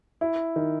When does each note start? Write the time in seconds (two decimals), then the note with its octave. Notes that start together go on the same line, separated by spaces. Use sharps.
0.21 E4
0.56 D#3